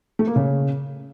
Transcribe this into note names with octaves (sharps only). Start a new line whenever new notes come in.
A3
A#3
C#3